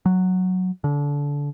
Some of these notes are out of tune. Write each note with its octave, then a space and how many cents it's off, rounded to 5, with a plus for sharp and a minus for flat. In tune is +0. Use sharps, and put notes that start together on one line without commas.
F#3 -5
D3 -25